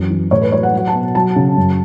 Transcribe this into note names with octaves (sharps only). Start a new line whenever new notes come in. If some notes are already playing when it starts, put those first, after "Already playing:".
Already playing: F#2 E3
E3
A2 C#5
B4
F#3 C#5
F#5
F#3 F#5
A5
B2
F#3 A5
C#3
F#2